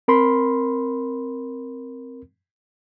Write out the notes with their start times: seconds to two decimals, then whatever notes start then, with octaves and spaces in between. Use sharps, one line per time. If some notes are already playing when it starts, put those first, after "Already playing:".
0.08 C4 A#4 B5 C6